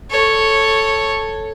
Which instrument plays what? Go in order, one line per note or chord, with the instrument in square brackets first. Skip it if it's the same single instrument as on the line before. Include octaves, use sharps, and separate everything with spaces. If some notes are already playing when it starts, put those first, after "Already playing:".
[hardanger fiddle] A4 C#5